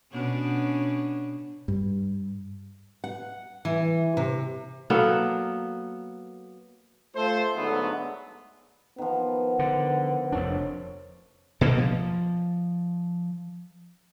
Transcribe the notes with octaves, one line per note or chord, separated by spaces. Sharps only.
B2 C#4 D4
G2
F#5
E3
C3
F#3 A#3 B3 A4
A3 F4 A4 C5
G#2 D3 F#3 A3 B3
D#3 F3 B3
D3
F1 F2 D4 C#5
B2 D3 A#3
F3